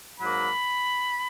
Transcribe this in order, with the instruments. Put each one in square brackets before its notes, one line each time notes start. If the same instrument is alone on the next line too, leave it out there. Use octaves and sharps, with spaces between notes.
[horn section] G#2 F#3 A#3 B5